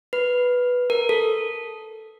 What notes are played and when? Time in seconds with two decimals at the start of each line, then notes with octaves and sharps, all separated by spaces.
0.13 B4
0.90 A#4
1.09 A4